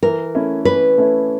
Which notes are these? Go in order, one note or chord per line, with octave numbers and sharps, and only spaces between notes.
E3 A#4
A3 C#4 E4
E3 B4
A3 C#4 E4